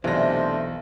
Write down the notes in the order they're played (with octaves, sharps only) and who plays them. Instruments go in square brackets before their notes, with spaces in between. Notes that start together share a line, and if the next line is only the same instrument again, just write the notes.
[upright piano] B1 A#6 [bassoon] C3 [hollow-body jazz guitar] E3 [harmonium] A3 D4 C5